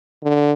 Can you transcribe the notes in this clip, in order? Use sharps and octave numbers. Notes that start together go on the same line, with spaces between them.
D3